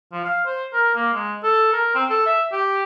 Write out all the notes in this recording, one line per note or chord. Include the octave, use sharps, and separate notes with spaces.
F3
F5
C5
A#4
A#3
G#3
A4
A#4
C4
A4
E5
G4